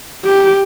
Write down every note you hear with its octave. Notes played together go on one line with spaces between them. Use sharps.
G4